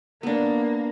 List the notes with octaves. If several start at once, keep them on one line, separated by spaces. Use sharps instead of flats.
A#3 B3 D4